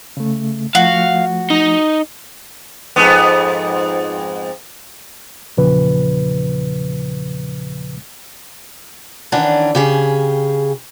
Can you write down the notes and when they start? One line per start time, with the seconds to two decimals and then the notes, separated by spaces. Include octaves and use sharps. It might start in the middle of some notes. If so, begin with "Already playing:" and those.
0.17 C#3 A3
0.75 F3 A3 F#4 F5
1.50 D#4
2.96 F2 G#2 B3
5.57 E2 A#2 C#3 F3 B4
9.32 D#3 E3 C#4 D4 F#5
9.75 C#3 G4 G#4